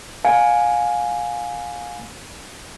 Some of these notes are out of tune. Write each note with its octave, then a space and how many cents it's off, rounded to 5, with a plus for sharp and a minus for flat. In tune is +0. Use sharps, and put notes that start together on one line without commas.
F5 +25 G#5 +5